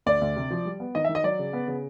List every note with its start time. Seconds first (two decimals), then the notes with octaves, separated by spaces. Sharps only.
0.06 D2 D5
0.21 D2
0.36 C3
0.50 F3
0.65 G3
0.80 B3
0.95 D#3 D#5
1.04 E5
1.09 D#3
1.15 D#5
1.24 F#3 D5
1.39 C#3
1.53 B3
1.68 C#3